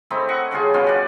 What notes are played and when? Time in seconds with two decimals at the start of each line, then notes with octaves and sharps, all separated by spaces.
0.10 A3 C4 D#4 E4
0.28 D#5 F#5 C#6
0.51 C#3 G3 F4 G#4
0.74 B2 G3 C#4 F4
0.87 F#4 D5